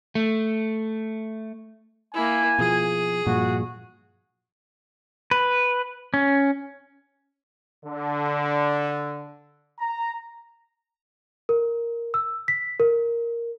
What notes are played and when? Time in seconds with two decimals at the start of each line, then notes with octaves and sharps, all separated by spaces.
0.15 A3
2.14 A#3 E4 G#5
2.59 B2 F3 G#4
3.27 G2 A#2 F3 F#4
5.31 B4
6.14 C#4
7.86 D3
9.80 A#5
11.49 A#4
12.14 E6
12.48 B6
12.80 A#4